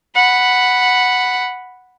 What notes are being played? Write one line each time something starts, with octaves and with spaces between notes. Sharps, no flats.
F#5 B5